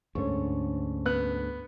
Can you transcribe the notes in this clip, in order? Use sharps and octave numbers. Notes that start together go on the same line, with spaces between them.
D2 G#2 D3 C#4 C#5
B3 F#6